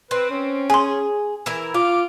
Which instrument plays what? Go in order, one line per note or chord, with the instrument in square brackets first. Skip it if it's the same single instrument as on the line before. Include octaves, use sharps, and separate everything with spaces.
[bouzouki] C4 [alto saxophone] B4
[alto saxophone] C#4
[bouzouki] G#4 [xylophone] G#5 C6
[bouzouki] E3 E4 A#4
[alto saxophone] F4 [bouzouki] F5 [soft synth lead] D6